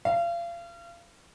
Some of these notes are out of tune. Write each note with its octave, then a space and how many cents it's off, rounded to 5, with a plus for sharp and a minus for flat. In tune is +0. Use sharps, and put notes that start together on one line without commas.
F5 -35